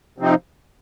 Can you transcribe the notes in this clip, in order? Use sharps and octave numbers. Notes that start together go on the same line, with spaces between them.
C3 F3 C4 D#4